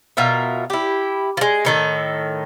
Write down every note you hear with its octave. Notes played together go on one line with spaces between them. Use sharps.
B2 F4 A#4 E5
E4 G4
F3 G#3
A2 D#3 A4